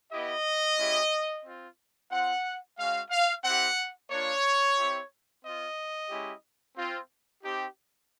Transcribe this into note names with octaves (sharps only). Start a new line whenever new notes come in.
B3 E4 G4 D#5
G#3 C#4 E4 G4
C4 F4
C4 F4 F#5
G#3 C#4 F#4 F5
F5
C4 E4 G4 F#5
A#3 D4 F4 C#5
C4 E4 G4
C4 F4 D#5
G#3 C#4 E4 G4
C4 F4
C4 D#4 G4